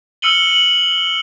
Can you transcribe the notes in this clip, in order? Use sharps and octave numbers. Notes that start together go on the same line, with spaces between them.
E6 F6 C#7 D#7 F#7 G7
F#7